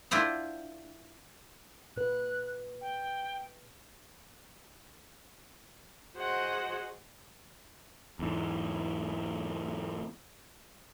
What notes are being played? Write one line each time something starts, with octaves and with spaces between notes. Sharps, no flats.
D4 E4 F4 C5 F#5
A#2 B4 F#6
G5
F#4 G#4 C5 D#5 F#5
E2 G#2